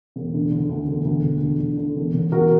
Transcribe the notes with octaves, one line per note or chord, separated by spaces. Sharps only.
E1
D3
D3
D2
E1
D2
E1
D3
D3
D3
E1
E1
E1 F#4 A#4